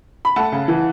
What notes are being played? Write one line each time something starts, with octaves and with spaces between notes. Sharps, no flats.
B5
A3 F#5 A5
C#3
E3